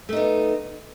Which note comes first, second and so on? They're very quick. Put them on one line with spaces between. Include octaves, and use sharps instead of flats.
A3 D#4 B3